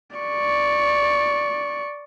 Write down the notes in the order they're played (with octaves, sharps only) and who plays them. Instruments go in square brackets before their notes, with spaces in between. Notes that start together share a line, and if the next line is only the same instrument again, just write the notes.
[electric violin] D5 C#6